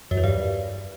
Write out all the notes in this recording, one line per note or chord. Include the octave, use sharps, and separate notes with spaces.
F#2
E2
G2